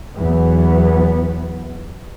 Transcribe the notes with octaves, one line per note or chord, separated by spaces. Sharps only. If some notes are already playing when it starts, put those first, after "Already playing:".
E2 E3 F#3 B3